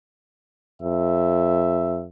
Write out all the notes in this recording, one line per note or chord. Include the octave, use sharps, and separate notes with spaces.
F2 E5